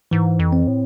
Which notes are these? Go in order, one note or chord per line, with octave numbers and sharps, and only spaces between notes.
G#2 E3
F2
C4
A2